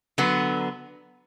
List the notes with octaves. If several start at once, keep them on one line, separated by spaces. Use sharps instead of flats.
D3 F#3 B3